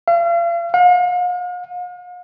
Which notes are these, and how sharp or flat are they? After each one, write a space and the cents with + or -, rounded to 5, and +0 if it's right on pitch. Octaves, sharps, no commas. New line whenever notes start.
F5 -40
F5 +45